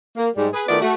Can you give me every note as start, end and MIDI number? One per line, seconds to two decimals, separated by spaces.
0.17 0.29 58
0.36 0.47 44
0.36 0.47 55
0.36 0.47 56
0.53 0.63 68
0.53 0.63 71
0.68 0.81 51
0.68 0.81 57
0.68 0.81 59
0.68 0.81 64
0.68 0.81 65
0.68 0.81 74
0.81 0.94 57
0.81 0.94 66